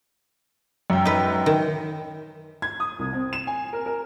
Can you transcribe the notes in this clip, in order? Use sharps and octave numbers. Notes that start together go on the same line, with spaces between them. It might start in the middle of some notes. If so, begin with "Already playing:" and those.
F#2 G5
D#4 B4
D#3 G5
G#6
D#6
C2
C4
E7
G#5
A#4
A#4